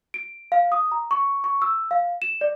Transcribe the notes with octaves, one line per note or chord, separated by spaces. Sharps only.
D7
F5
D#6
A#5
C#6
C#6
E6
F5
E7
D5